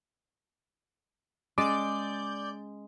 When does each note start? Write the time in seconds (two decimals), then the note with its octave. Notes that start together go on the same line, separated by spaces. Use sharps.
1.58 G#3 C#4 D5 D6 G6